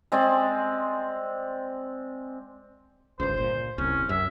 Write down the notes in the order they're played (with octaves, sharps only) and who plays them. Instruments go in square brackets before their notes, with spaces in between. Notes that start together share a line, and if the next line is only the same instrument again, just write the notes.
[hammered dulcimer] G#3 C4 D5
[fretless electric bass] G1 C#2 [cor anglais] C5
[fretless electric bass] A#2
[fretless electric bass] D1 C2 [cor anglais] C#4
[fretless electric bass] F#2 [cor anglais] E5